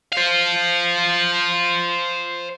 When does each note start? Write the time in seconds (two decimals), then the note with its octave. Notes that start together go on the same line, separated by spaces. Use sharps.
0.12 C5 F5